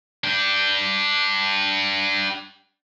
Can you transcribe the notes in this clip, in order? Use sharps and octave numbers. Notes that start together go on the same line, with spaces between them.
D4 G4